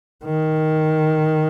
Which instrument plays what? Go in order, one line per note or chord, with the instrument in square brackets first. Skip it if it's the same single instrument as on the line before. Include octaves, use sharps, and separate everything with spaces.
[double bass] D#3